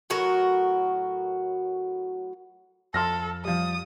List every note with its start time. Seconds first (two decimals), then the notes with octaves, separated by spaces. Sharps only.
0.10 A2 F#3 F#4 A#4
2.94 F2 A4 C6 F6 A#6
3.45 F3 G3 D#6